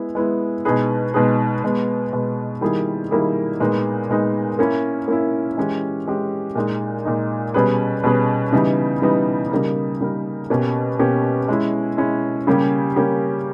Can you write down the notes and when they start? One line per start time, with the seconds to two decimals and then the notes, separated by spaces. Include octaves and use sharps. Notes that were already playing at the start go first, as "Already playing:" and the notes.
Already playing: G#3 B3 E4
0.15 G#3 B3 E4
0.65 B2 G#3 D#4 G#4 B4
1.14 B2 G#3 D#4 G#4 B4
1.63 B2 G#3 B3
2.13 B2 G#3 B3
2.61 D#3 G3 A#3 E4 G#4
3.10 D#3 G3 A#3 E4 G#4
3.60 A#2 G#3 B3 D#4
4.09 A#2 G#3 B3 D#4
4.59 A#3 C#4 E4
5.08 A#3 C#4 E4
5.57 E3 G#3 C#4 G4
6.07 E3 G#3 C#4 G4
6.55 A#2 G#3 D#4
7.05 A#2 G#3 D#4
7.54 B2 G3 C#4 G#4 B4
8.04 B2 G3 C#4 G#4 B4
8.53 C#3 E3 G3 B3 D#4
9.02 C#3 E3 G3 B3 D#4
9.51 C#3 G3 A#3 D#4 A#4
10.01 C#3 G3 A#3 D#4 A#4
10.50 B2 A#3 C#4 G4
10.99 B2 A#3 C#4 G4
11.48 G#3 C#4 E4
11.98 G#3 C#4 E4
12.47 C#3 G3 A#3 C#4 G4
12.96 C#3 G3 A#3 C#4 G4